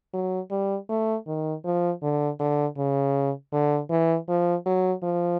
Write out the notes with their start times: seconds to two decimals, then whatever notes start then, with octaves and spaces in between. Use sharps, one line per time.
0.14 F#3
0.51 G3
0.89 A3
1.27 D#3
1.65 F3
2.03 D3
2.40 D3
2.78 C#3
3.53 D3
3.90 E3
4.29 F3
4.66 F#3
5.03 F3